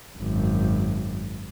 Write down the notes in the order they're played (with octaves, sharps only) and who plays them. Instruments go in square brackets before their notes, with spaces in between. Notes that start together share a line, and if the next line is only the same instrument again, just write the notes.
[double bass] G#1 F#2